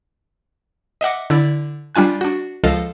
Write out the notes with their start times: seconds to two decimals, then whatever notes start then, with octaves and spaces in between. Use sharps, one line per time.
1.01 D#5 E5 F#5 D6
1.30 D3 E4 D5
1.95 G3 D4 F4 G#5 F#6
2.21 D4 F#4
2.64 C#2 F3 A4 D#5 F5